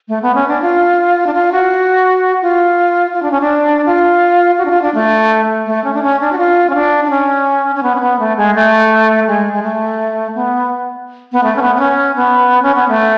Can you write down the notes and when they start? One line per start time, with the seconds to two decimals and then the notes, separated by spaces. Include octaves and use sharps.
0.08 A3
0.22 B3
0.35 C#4
0.48 D4
0.62 F4
1.27 D4
1.34 F4
1.52 F#4
2.42 F4
3.13 F4
3.23 D4
3.31 C#4
3.41 D4
3.86 F4
4.58 F#4
4.65 D4
4.70 F4
4.82 D4
4.94 A3
5.66 A3
5.84 C#4
5.94 D4
6.03 C#4
6.21 D4
6.32 F#4
6.38 F4
6.70 C#4
6.75 D4
7.05 D4
7.10 C#4
7.75 C#4
7.83 B3
7.95 C#4
8.00 B3
8.19 A3
8.37 G#3
8.55 A3
9.27 G#3
9.53 G#3
9.63 A3
10.35 B3
11.32 B3
11.43 A3
11.56 C#4
11.62 B3
11.76 B3
11.79 C#4
12.16 B3
12.62 C#4
12.75 B3
12.88 A3